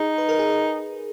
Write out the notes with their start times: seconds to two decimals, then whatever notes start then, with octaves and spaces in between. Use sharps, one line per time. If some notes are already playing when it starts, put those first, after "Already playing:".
Already playing: D#4 G#4
0.18 B4
0.29 A#4
0.39 G#4
0.50 A#4